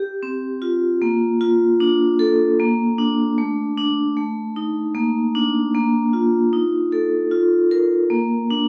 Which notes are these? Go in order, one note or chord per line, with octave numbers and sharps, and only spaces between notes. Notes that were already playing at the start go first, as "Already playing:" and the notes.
Already playing: G4
C4
F4
A#3
F4
D4
A4
A#3
D4
A3
D4
A3
D#4
A#3
D4
A#3
F4
D#4
A4
F4
A#4
A#3
D4